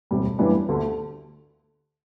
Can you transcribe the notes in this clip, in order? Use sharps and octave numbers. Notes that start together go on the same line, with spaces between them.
E1 D2 C3 G3
G1 F#2 E3 G3 D4
D2 D3 A3